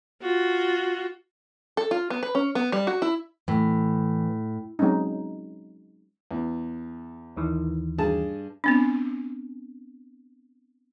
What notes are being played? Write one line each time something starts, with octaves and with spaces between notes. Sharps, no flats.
F4 F#4
A4
F4
B3
B4
C#4
B3
G3
F#4
E4
A2 E3
F#3 G#3 C4 C#4 D#4
E2
D#2 D#3 E3
G2 G#4 A5
B3 C4 D4